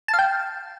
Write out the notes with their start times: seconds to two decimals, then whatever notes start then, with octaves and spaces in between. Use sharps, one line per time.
0.08 A5
0.13 F5
0.19 G5